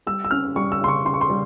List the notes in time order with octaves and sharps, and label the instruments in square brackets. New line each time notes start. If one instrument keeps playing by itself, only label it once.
[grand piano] G3 E6
E6
C#4 F6
G3 C#6
E6
C#3 C6
C#6
C#3 C6
C#6
C6
G3